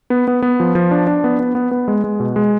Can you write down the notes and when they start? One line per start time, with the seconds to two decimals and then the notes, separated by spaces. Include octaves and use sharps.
0.10 B3
0.28 B3
0.42 B3
0.60 F3
0.75 F3
0.91 D4
1.07 D4
1.24 B3
1.39 B3
1.55 B3
1.71 B3
1.88 G#3
2.04 G#3
2.20 B2
2.36 G#3